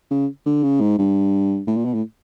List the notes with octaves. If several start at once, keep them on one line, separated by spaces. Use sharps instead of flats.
C#3
D3
C#3
G#2
G2
A2
A#2
B2
A2